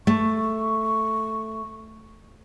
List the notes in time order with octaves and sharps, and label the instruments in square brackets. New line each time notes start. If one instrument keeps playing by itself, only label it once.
[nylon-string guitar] A3 [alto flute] C#6